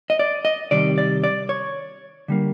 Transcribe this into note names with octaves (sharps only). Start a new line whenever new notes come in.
D#5
D5
D#5
C3 D#3 G3 D5
D5
D5
C#5
D3 G3 A#3